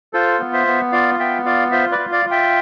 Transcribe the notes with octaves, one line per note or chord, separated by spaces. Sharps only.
F4 A4 C5
B3
C5 E5
B3
F4 D5 F5
B3 E5 G5
F4 D5 F5
F4 C5 E5
B4 D5
F4
D5 F5
F4
E5 G5